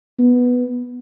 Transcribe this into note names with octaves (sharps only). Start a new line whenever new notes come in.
B3